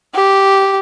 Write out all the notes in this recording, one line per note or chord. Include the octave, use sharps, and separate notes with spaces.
G4